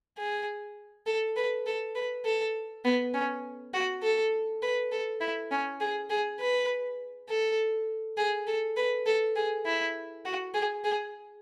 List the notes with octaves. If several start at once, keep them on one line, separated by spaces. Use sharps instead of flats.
G#4
A4
B4
A4
B4
A4
B3
C#4
F#4
A4
B4
A4
E4
C#4
G#4
G#4
B4
A4
G#4
A4
B4
A4
G#4
E4
F#4
G#4
G#4